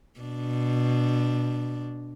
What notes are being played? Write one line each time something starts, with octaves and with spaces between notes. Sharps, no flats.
B2 D4